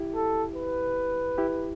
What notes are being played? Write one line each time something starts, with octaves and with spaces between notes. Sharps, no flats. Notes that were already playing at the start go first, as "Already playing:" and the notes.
Already playing: E4 G4
A4
B4
E4 G4